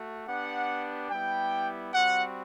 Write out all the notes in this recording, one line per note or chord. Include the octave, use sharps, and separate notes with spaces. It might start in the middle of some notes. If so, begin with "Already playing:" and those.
Already playing: A3 F#4
B3 D4 G4 F#5
G3 B3 E4 G4 G5
G3 C4 F#4 F#5